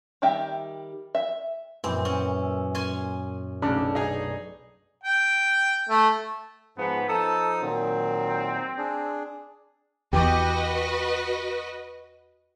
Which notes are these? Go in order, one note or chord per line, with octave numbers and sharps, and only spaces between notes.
D#3 G3 G4 E5
E5
F#2 A#2 E3 C4 G6
C#4
E5
C#4 G#5 C6
B1 C#3 A3 D4
D#4 G#4
G5
A3
G#2 F3 B3
F3 D#4 A4 D#6
A#2 D#3 F#3 C4
D4 G#4
E2 F#4 G4 B4 D#5